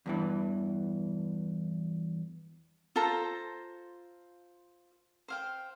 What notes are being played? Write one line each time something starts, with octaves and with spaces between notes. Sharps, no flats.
E2 G2 E3
F4 A4 C5 A#5
C5 F5 G5